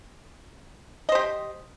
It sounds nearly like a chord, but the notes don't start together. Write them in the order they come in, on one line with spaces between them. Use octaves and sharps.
D#5 C5 G4